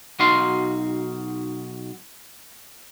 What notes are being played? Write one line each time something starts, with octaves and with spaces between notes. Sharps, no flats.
B1 D#4 F#4 F5 C6